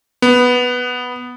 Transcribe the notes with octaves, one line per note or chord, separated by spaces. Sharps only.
B3